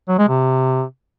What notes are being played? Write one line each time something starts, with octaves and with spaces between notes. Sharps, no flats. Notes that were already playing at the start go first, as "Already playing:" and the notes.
F#3
G#3
C3